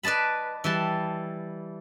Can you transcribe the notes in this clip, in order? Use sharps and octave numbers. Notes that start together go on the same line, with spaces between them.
B4 D5 D#5 A5 B5
E3 G3 A5